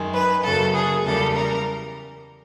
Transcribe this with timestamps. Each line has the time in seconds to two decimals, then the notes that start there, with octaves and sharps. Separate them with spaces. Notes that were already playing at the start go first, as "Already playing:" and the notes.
Already playing: F#2 D#3 G#3
0.13 B4
0.43 F#2 C#3 F#3 A#3 A4
0.74 G#4
1.05 E2 C#3 E3 G3 A#3 A4
1.35 A#4